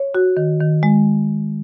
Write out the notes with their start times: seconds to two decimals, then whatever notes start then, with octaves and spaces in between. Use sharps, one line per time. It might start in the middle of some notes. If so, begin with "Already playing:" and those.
Already playing: C#5
0.15 F#4
0.37 D#3
0.60 D#3
0.83 G#3